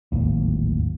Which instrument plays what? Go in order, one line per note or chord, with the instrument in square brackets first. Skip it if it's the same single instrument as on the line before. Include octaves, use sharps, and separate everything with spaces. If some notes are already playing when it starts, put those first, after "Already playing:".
[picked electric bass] D1 G#1 D#2